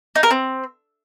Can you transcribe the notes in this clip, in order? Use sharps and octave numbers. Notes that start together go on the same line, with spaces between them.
D#4
A#4
C4